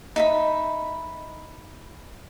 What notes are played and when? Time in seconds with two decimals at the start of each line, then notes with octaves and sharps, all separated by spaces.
0.16 D#4 E5 B5